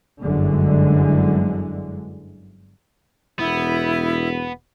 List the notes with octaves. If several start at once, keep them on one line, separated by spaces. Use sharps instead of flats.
G1 F#2 D3 E3 G#3
E1 B3 E4